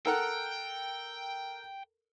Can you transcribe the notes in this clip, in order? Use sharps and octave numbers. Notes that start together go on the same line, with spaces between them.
A4 A#4 F#5 G5